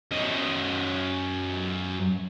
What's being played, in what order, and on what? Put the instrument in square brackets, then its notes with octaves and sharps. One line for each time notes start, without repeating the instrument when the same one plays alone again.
[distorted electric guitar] F#2 D#5